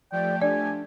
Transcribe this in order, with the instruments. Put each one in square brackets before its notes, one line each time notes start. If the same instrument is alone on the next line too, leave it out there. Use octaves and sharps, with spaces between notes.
[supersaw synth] F3 A3 G4 [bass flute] D5 [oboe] G5
[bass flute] D4 [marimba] D5 [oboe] G#5